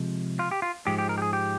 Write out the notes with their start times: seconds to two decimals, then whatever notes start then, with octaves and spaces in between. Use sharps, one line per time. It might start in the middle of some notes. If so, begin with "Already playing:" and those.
Already playing: C3 F3 G#3
0.39 F4
0.51 G4
0.62 F4
0.87 G#2 F3 G#3 G4
0.98 G4
1.09 A#4
1.18 G4
1.22 G#4
1.33 G4